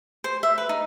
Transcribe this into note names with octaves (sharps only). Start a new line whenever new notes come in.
C5
E5
B4
D#4